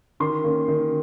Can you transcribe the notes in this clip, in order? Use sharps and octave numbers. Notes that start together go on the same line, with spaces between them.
D#3 C6
A#3 C#4
D#3